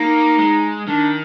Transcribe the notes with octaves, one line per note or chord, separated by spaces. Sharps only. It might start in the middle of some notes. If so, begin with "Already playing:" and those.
Already playing: A#3 D#4
G#3
D#3 D4